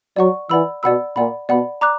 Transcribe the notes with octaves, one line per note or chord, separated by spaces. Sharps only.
F#3 D5 F#5 C#6
E3 D5 F#5 B5 E6
B2 D5 F#5 B5 E6
A#2 D5 F#5 B5
B2 D5 F#5 B5
D5 A#5 D6 F#6